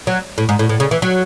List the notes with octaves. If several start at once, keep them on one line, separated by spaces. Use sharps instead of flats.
F#3
A2
G#2
A2
A2
C#3
E3
F#3